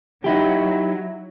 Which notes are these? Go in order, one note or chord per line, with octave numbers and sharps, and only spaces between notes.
F#3 D#4 E4 G4